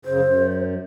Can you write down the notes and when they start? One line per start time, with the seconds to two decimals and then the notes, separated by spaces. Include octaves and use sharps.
0.05 F#2 C#3 C5
0.21 F#2